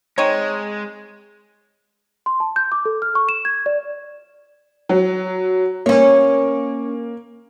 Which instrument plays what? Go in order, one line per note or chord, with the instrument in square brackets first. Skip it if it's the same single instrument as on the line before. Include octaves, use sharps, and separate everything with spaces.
[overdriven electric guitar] G#3 [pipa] C4 D#4 C#5
[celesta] C6
A5
G6
D6
A4
F6
C#6
E7
G#6
D5
[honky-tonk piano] F#3
[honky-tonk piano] A#3 [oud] C#4 C#5